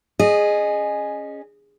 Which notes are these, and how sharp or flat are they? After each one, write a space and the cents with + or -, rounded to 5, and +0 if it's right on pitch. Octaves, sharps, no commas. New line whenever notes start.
C#4 +0 G#4 +0 D#5 -20